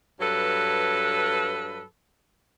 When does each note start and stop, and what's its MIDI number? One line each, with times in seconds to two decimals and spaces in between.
0.20 1.83 43
0.20 1.83 54
0.20 1.83 69
0.20 1.83 71